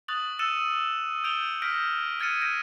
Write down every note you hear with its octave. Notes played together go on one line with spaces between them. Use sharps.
C#6 D#6 F#6 A6 F7 F#7
E6 F#6 A6 C#7 D#7 E7
D#6 G6 D7 F7 G7
F6 G6 A#6 B6 D7
F6 G#6 A6 C#7 D#7
G6 A#6 D7